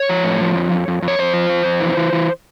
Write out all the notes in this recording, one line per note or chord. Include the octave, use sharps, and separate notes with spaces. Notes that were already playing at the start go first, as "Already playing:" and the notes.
Already playing: C#5
F3
A2
F3
F2
F2
F2
F2
C#5
F2 C5
F3
F2
F2
E3
E3
E3